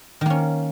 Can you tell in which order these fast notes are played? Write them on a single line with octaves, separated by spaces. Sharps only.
D#3 A#3 C#4